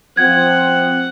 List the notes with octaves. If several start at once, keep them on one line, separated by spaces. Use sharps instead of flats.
F3 C4 F#5 G#6